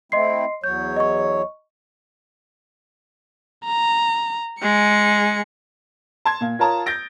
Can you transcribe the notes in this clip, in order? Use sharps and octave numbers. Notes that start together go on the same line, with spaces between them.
A3 C4 E4 D#5 C6 C7
E2 F#3 C#5 G6
D#5 C#6
A#5
G#3 C#7
A5 C6 G#6
A#2 F5
F4 A#4 C#5 A5 A#5 D#6
G6 A6 A#6 D7